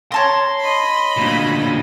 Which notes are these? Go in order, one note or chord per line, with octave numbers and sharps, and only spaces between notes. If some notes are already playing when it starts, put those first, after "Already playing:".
C#5 A5 A#5 C6
D#5 B5
D2 A#2